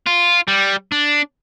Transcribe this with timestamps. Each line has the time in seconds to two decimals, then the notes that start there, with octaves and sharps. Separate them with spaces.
0.06 F4
0.48 G3
0.92 D4